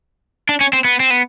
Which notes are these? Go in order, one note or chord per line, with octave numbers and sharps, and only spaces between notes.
D4
C#4
C4
B3
C4
B3